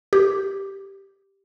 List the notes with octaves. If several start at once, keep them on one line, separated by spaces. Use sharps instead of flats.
G4